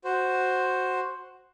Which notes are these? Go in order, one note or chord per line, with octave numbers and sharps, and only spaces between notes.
F#4 C5